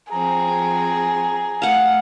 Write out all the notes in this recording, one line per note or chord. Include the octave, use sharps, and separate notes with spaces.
F3 C4 G#4 A#5
A3 F5 F#5